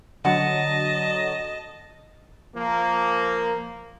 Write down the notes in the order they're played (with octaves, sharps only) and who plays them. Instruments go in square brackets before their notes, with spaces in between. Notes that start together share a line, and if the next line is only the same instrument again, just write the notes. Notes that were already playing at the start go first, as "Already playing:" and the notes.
[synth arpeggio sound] D3 F#3 [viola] D#5 [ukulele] F#5 [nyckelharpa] A5
[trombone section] F3 A#3